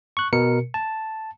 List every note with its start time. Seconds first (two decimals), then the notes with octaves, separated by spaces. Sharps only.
0.17 C#6 F#6
0.33 B2 A#4 C#7
0.74 A5